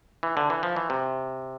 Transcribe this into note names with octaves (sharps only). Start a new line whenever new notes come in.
E3
D3
E3
F3
E3
C3